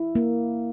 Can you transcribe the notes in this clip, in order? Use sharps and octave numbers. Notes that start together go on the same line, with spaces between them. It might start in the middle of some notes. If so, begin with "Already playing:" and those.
Already playing: E4
A#3